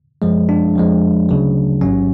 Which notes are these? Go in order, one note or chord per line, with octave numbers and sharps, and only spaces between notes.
F#2 F3 G#3
D4
F2 F3 G#3
D2 C#3 F#3
A1 G#2 F#3 C#4